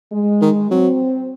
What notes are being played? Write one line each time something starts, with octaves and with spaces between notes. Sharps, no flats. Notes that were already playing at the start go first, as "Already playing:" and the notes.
G#3
D#3
F#3 C4